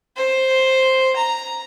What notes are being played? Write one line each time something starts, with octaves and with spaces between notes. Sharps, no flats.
C5
A#5